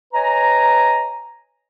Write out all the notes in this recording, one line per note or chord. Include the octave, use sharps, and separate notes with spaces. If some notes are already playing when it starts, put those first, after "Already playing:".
B4 C#5 D#5 G#5 A#5